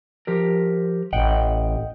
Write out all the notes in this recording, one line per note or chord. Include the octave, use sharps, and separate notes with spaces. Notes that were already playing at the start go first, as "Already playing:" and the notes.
F3 G4 A#4
A1 D#5 F#5 G5